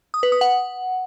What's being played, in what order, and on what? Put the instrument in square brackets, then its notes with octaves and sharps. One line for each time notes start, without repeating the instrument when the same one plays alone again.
[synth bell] D#6
B4
D#6
F#5